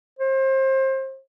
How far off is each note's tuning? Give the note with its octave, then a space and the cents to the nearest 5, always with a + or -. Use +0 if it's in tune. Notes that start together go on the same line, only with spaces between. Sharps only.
C5 +30